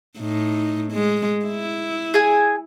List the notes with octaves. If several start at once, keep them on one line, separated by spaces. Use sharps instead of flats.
A2 D#4
G#3
E4
G#4 G#5